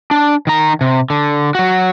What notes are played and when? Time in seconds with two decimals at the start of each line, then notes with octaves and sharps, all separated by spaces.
0.11 D4
0.47 D#3 A#5
0.81 C3
1.10 D3
1.55 F#3 F#4